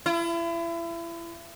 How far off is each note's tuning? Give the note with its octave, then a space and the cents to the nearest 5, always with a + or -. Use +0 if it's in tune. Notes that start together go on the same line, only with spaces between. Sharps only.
E4 +35